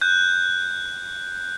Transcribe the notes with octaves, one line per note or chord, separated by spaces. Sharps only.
F#6 G6